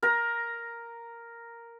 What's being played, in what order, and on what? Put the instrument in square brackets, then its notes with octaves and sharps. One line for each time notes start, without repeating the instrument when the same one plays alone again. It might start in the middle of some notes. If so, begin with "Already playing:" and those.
[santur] A#4 A#5